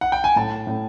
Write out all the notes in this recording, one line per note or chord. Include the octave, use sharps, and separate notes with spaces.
F#5
G5
G#5
A2 A5
A2